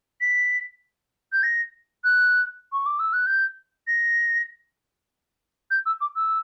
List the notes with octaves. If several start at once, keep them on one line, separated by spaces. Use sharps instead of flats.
B6
G6
A#6
F#6
C#6
D6
E6
F#6
G6
A#6
G6
E6
D6
E6